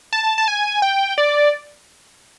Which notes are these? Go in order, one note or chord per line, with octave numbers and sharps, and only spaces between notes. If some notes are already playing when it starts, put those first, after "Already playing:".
A5
A5
G#5
G5
D5